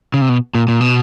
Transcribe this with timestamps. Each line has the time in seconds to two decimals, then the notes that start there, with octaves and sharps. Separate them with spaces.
0.14 C#3
0.21 C3
0.29 B2
0.55 A#2
0.68 A#2
0.81 B2